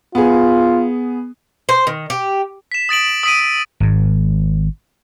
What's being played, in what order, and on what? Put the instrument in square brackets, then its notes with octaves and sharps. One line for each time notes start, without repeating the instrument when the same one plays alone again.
[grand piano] B3 G#4 [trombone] F4
[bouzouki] C5
D#3
G4
[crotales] B6 E7
D#6 A6 D7 F#7
D#6 E6 B6 D7 D#7
D#7
[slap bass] G#1 G#2